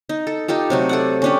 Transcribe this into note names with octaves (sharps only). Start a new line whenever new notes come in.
D#4
A4
D#4 F4 G4 A4
C3 F#3 A3
A4 D5 F#5
C#4 D4 G4